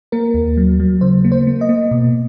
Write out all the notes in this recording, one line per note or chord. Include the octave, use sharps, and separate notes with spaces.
A#3 A#4
D#2
F#3
F#3
C#3 C5
A#3
C5
A#3
D#5
A#3
B2